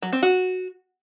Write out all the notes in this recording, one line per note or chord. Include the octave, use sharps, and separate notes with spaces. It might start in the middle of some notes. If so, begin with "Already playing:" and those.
F#3
C4
F#4